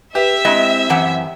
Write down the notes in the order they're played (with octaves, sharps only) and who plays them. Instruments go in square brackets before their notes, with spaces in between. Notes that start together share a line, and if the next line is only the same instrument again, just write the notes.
[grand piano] G4 [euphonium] B4 [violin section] E5
[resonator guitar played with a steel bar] G#3 E4 D#5 [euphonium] C4
[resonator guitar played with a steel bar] F#2 E3 F#5